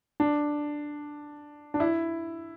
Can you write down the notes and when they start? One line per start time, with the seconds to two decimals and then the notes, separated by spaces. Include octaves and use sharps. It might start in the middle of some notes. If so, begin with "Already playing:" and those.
0.20 D4
1.74 D4
1.80 E4